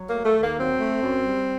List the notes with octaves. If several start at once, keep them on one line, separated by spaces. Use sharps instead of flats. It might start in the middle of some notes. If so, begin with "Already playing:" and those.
Already playing: F#3
A#3
A3
A3
D#2
A#3
F#3 C4
A3
F#2
G3